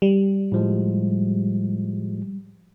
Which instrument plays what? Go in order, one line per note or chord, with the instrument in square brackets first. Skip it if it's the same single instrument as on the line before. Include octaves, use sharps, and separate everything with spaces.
[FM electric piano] G3
[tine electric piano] A2 F3 G#3